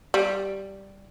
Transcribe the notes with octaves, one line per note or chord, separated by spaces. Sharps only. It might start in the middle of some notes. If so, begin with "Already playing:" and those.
G3